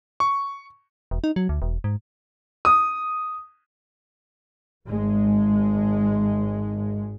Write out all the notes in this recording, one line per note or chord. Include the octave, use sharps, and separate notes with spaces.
C#6
E1
D#4
F#3
D2
E1
G#2
D#6
G#1 G#3